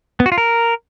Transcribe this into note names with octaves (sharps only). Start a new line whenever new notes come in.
B3
F#4
F4
A#4